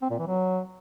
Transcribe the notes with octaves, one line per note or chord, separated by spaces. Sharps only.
C4
A#2
E3
F#3